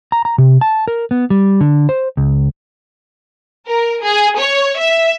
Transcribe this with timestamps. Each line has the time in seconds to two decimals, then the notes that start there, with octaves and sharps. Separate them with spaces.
0.12 A#5
0.25 A#5
0.38 C3
0.61 A5
0.88 A#4
1.11 B3
1.30 G3
1.61 D3
1.89 C5
2.17 C#2
3.68 A#4
4.03 G#4
4.39 C#5
4.77 E5